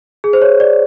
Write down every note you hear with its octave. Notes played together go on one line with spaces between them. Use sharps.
G#4
C5
C#5
D5